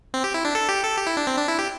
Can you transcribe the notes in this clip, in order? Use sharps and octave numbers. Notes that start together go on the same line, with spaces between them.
C4
G4
E4
D4
A4
G4
A4
G4
E4
D4
C4
D4
E4
G4